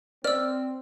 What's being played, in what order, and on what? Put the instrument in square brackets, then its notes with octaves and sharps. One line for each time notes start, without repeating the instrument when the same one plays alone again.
[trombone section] C4 [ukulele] D5 [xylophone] E6 F6